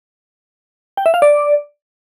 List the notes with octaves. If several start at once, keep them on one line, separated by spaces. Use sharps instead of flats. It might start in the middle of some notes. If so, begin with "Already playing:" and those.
G5
E5
F5
D5